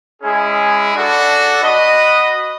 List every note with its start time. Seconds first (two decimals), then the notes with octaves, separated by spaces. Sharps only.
0.22 G#3 C#4 E4 G#4
0.93 D4 F#4 A4
1.62 F#4 B4 D#5